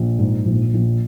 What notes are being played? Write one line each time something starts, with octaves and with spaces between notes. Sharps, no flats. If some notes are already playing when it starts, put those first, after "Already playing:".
Already playing: A#1
G#2
A#1
A#1